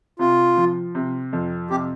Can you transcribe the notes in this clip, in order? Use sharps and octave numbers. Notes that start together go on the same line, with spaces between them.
C3 F4
F3
C3
F2
C3 G4